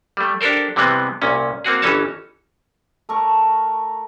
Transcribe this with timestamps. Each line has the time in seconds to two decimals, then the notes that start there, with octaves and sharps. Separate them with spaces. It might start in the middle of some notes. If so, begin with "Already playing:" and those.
0.17 G3 A3
0.41 D4 G4 A4 A#4 C5
0.76 C3 E3 G3 G#3 B3 C4
1.22 C2 A#2 C#4
1.64 A#3 C4 F#4 G#4
1.82 G1 E3 C#4 D#4 C#5 A5
3.09 A3 A#4 C#6